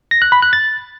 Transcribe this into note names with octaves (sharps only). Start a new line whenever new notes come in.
A#6
F#6
B5
F#6
A6